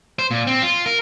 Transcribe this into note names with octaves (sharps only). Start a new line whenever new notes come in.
C5
A#2
C4
F4
A#4